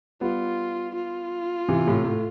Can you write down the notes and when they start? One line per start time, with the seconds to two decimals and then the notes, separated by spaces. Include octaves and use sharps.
0.21 G3 B3 F4
0.95 F4
1.69 C3 E3
1.87 A2 C3
2.05 A2